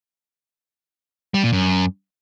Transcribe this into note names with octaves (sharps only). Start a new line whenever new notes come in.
G3
A#2
F#2